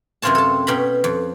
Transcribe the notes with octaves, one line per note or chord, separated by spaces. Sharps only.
F#2 C3 C4 F4 C#5 A5
A4 A5
B2 C#4 G5 A#5 B5
F2